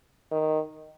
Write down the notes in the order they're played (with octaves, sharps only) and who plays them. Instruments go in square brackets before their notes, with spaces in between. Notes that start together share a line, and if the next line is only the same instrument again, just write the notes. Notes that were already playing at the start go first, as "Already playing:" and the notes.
[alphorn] D#3